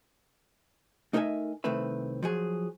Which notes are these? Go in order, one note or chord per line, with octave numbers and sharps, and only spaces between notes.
A3 D#4 A#4 D#5 E5 G#5
C2 D#3 A3 C4 B4 E5
F3 F#3 G#4